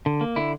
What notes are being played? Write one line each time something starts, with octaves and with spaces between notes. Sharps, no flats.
D3
A#3
D3 E4